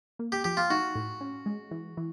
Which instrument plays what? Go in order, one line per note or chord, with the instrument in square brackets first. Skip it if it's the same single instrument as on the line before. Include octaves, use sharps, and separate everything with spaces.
[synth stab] A#3
[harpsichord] G4
[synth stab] F3 [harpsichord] G4
[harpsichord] F4
[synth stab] D#4 [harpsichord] F#4
[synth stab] A2
C#4
G#3
E3
E3